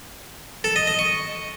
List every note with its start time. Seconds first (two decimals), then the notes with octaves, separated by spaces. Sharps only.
0.64 A4
0.76 D#5
0.87 D#5
0.99 C#6